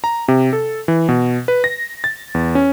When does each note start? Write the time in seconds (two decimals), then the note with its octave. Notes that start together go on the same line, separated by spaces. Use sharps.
0.04 A#5
0.28 C3
0.53 A4
0.88 E3
1.09 B2
1.48 B4
1.64 A#6
2.04 A6
2.35 E2
2.55 C#4